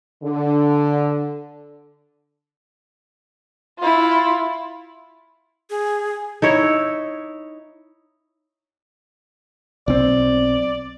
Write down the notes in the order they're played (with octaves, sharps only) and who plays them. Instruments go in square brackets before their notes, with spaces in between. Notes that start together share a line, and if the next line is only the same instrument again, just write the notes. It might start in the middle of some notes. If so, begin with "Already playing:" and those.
[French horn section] D3
[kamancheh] E4 F4
[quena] G#4
[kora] D#4 E4 C#5
[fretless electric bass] B1 C4 [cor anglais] D5